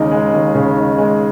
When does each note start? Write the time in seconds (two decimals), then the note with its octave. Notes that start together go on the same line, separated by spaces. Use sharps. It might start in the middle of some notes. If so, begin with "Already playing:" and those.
Already playing: D#2 C#3 G#3 D#4
0.11 G#3
0.33 D#2
0.55 C#3
0.76 D#4
0.98 G#3